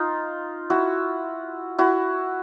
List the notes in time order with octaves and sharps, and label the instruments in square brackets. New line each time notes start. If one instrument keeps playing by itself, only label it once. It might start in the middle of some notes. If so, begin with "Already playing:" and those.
Already playing: [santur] D#4 F4
E4 F#4
E4 F#4